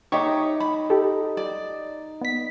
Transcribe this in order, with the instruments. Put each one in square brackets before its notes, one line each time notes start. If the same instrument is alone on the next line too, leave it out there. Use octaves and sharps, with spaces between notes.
[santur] D#4 D#6 [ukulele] G4 C#5 E5 [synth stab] C#6
[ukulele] B5
[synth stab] G4 A4
[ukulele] D5
[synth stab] B3 B6